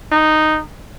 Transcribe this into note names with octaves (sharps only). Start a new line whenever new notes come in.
D#4